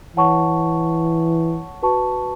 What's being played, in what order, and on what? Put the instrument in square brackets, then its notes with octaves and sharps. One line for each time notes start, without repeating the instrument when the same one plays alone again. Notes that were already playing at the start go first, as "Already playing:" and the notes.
[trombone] E3 [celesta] C#5 F#5 A5 C#6
[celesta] F#4 B4 A5 C#6